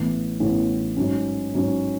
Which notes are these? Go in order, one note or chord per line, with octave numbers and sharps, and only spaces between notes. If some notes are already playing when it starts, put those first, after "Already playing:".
Already playing: A1 A2 E3 B3
A1 A2 E3 B3
G#2 F#3 C#4
G#2 F#3 C#4